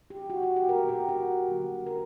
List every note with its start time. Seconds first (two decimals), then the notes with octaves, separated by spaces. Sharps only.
0.10 G4
0.30 F#4
0.43 F#4
0.56 G4
0.69 B2 A#3 A#4
0.89 G4
1.09 F#4
1.48 D3 F#3 A#3
1.87 A#4